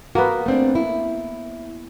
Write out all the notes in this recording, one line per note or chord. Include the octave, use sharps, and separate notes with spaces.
A#3 B3 F#4
A3 C4 D4
E4